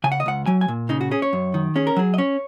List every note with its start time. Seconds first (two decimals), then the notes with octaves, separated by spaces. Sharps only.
0.04 C#3 G#5
0.12 F#5
0.20 D#5
0.26 C#2 F#5
0.46 F#3 G#5
0.61 G#5
0.68 A#2
0.89 C#3 D#4
1.01 F#4
1.11 C#4 G#4
1.22 C#5
1.33 F#2
1.54 D#3
1.76 C#4 G#4
1.87 A#4
1.96 F#3 G#4
2.14 D#5
2.18 C#4 C#5